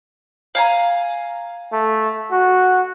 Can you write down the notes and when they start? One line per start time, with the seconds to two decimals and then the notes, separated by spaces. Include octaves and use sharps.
0.55 F5 G#5 A#5
1.72 A3
2.31 F#4